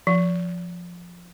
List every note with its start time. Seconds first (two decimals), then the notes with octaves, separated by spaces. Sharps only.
0.07 F3